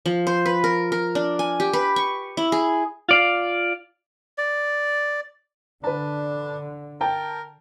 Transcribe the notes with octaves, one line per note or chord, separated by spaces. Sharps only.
F3
C5
B4
A#4
A#4
D4
G#5
G4
B4
C#6
E4
G#4
F4 D5 F5
D5
D3 D4 B4 A5
A#4 G5 A5